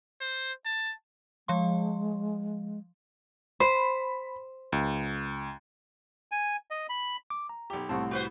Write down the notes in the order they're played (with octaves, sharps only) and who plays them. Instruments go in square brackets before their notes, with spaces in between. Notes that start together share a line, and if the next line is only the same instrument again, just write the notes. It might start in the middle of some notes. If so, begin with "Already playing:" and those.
[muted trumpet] C5
A5
[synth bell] F3 F5 C6 [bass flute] G#3
[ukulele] C5 [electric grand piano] B5
[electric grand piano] C#2
[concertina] G#5
D#5
B5
[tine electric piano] D6
A#5
[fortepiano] B1 G4
[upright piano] C2 A2 [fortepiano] C4 [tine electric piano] A5 C#6
[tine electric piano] E4 [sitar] F#4 B4 C5